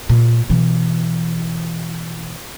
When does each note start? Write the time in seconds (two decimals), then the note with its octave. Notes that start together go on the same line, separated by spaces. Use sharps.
0.09 A#2
0.49 B2 E3